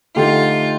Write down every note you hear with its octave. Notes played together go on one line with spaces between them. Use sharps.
D3 A3 D#4 F4 G4